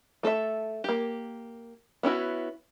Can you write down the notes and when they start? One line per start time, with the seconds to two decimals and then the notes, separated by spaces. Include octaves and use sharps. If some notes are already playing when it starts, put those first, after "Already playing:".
0.23 A3 A4 C5 E5
0.84 A#3 G4
2.03 B3 C#4 E4 F#4